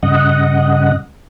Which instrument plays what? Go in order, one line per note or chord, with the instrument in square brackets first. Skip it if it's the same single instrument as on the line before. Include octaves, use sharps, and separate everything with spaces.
[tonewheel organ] G2 C#3 D#5 F#5